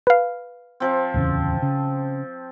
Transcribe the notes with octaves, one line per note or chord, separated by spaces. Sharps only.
B4 F5
F3 C4
D1 E2 C#3
C#3